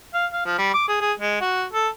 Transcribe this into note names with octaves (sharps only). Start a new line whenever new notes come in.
F5
F5
F3
G3
D6
G#4
G#4
G#3
F#4
A4